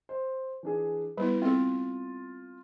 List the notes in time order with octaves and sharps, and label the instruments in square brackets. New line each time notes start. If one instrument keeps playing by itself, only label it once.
[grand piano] C5
E3 D4 G#4
[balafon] G3 B3 E4 [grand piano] B4
[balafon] C4 A4 [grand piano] F4